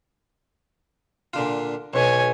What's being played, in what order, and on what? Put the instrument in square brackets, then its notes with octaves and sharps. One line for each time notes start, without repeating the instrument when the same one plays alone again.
[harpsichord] A#2 D3 F4
[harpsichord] B1 B2 [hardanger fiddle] C#5 G#5